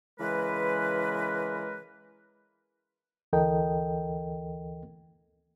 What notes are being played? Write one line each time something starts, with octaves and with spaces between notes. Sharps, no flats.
C#3 E3 G#3 A#4 B4
D2 E3 A4 A#4 D#5 G5